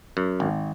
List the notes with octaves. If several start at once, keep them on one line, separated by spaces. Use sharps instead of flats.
F#2
G#1